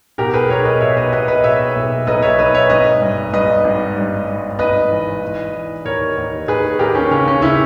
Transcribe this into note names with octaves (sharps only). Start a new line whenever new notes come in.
B2 G4 A#4
G#4 B4
B1 A#4 C#5
B4 D#5
B2 C#5 E5
B4 D#5
B2 B4 D#5
B4 D#5
B2 C#5 E5
B1
B1 B4 D#5
C#5 E5
B1 B4 D#5
C#5 E5
G#1 B4 D#5
G2
G2 B4 D#5
G#1
G2
G2
G#1 B4 D#5
E3
E3
E3
D#2 A#4 C#5
D#2
D#2 G#4 B4
D#2 G4 A#4
C#4
C#3 C#4
C#4
C#3 C#4 E4